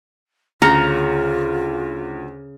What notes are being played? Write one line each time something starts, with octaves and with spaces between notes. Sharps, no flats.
D2 C#3 F4 A#5 F6 C#7